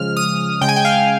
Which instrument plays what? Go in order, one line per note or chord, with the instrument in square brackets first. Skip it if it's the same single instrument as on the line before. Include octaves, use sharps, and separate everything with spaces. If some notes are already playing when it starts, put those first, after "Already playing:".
Already playing: [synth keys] C#3 F3 G#3 F6
D#6
C#3 G#3 G5
G#5
G5
F5